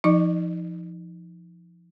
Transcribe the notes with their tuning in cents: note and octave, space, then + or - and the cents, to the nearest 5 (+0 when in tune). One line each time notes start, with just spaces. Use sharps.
F3 -20 D#4 +15 D5 +35